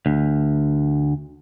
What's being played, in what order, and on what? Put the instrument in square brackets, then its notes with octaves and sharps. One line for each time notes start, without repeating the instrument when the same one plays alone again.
[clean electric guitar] D2